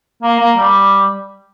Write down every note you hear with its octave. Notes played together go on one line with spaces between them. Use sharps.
A#3
A#3
G3